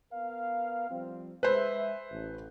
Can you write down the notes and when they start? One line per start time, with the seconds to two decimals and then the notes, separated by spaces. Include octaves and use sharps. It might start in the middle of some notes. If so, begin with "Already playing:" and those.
0.13 B3 A#4 F5
0.90 F3 G3 C4
1.43 G#3 B4 C5 E5
2.11 A1